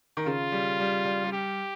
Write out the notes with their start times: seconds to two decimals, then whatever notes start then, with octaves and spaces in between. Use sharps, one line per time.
0.17 D#3
0.26 C#3 F4
0.52 G3
0.80 G3
1.05 G3
1.24 G3
1.32 G4